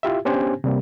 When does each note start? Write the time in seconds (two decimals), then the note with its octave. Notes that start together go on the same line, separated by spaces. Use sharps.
0.03 E4 F4 G4 E5
0.25 B3 C#4 D4 G4 C5 G#5
0.64 C3 G3 A#3